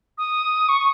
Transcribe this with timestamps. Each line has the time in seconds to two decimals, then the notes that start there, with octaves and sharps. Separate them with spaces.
0.18 D#6
0.69 C#6